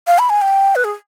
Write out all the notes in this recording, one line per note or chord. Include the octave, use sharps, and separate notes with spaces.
F5
B5
G#5
G5
B4
G#4